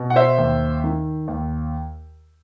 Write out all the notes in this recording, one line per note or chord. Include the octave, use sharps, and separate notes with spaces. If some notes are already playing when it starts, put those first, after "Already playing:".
Already playing: B2
F#5
C5 E5
D#2
D#3
D#2